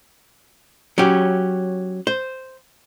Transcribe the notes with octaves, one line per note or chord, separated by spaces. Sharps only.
F#3 C#4 G4
C5